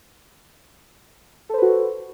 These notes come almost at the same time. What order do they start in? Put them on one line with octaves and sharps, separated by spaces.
A4 C5 B4 F#4